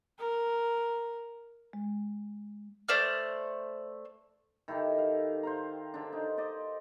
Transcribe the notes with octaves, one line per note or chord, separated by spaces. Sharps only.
A#4
G#3
A3 C5 D5 F6
D#3 E4 G4 A4
F5
C5 F5 A#5
D3 D4
D#4
C5 D5 D#5